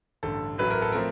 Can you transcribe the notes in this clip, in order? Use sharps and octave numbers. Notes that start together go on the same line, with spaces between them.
A1 G2 D3 A4
A1 A2 F#3 A3 B4
A#4
A4
F3 A3 C4 A#4